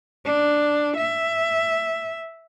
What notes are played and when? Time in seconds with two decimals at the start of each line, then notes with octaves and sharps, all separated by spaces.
0.25 D4
0.97 E5